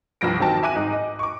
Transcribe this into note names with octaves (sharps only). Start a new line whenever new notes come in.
C2 G2 F3 A#6 D7
A#1 D#3 F#3 C4 G5 A5
E5 G#5 D6 F#6 D#7
G#2 D#4
D#5
C#6 D6